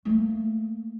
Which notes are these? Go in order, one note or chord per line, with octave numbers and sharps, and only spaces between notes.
A3 A#3